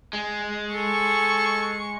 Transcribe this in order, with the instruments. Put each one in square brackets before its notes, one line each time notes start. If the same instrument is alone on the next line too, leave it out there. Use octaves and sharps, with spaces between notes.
[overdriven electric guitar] G#3
[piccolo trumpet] A4 [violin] C#6